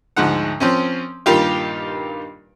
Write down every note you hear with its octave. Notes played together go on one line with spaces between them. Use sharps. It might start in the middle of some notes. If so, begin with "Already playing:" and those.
D2 G#2 F3 F#5
F3 C4 C#4
G2 A#2 D#3 G3 F4 G4